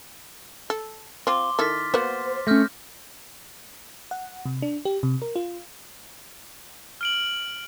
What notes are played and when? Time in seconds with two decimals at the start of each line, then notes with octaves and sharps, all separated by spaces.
0.70 A4
1.27 C4 F4 C6 D6 G7
1.59 D#3 E4 A4 F6 A6 B6
1.94 A#3 B3 F#4 C5
2.47 A3 C#4 F6 G6 A#6
4.11 F#5
4.46 C3
4.62 D4
4.85 G4
5.03 C3
5.22 A#4
5.36 F4
7.01 F6 D7 F#7